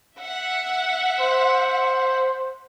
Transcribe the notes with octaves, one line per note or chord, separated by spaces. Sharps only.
E5 F#5
C5